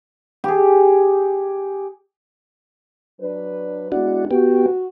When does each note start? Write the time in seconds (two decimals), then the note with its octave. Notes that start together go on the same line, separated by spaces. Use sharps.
0.44 G4 G#4
3.21 F#3 D4 B4
3.92 G#3 B3 D4 E4 F#4
4.31 B3 F#4 G4